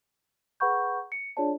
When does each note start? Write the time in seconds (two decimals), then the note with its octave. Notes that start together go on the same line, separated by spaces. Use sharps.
0.60 G#4 B4 F#5 B5 C#6 G6
1.12 C#7
1.37 D4 F4 G#4 C#5 D5 A5